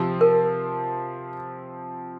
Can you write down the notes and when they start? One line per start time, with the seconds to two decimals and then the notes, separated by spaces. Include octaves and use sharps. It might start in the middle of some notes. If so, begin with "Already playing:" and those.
Already playing: C3 F3 C4
0.21 A#4